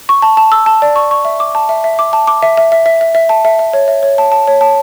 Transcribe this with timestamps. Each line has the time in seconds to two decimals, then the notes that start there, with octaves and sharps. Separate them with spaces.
0.09 C#6
0.22 A5
0.37 A5
0.52 E6
0.66 A5
0.82 D5
0.96 C#6
1.11 C#6
1.25 E5
1.40 D6
1.55 A5
1.69 E5
1.84 E5
1.99 D6
2.13 A5
2.27 D6
2.43 E5
2.57 E5
2.72 E5
2.86 E5
3.01 E5
3.15 E5
3.29 A5
3.45 E5
3.59 E5
3.73 C#5
3.88 E5
4.03 C#5
4.18 A5
4.32 A5
4.47 C#5
4.61 A5